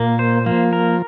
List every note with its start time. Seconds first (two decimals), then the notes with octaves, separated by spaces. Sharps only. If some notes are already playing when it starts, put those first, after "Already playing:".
Already playing: A#2 A#3
0.19 C5
0.46 F3 A#3
0.73 A#4